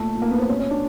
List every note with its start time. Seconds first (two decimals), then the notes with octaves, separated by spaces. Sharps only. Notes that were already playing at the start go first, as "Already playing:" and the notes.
Already playing: A#2 A3
0.15 A#2
0.22 A#3
0.31 B3
0.40 C4
0.48 B2 C#4
0.60 C#4
0.71 D4